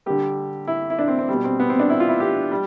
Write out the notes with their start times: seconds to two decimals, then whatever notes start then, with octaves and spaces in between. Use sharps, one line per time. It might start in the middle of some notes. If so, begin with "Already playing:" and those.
0.06 D3 G3 G4
0.67 E4
0.90 E4
0.99 D4
1.08 C4
1.19 C4
1.29 B2 G3
1.44 C4
1.60 B3
1.70 C4
1.80 D4
1.90 E4
2.00 F4
2.09 E4
2.20 G4
2.52 G3